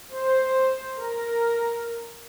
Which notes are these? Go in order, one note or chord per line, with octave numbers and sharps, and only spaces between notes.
C5
A#4